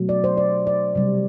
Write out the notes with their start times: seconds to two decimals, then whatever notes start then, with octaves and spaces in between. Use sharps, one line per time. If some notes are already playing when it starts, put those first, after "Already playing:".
Already playing: B2 F#3 A3
0.09 D5
0.24 C5
0.37 D5
0.67 D5
0.95 C3 G3